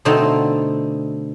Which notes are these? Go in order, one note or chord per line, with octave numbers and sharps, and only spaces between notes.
B2 D3 A3 C4 D#4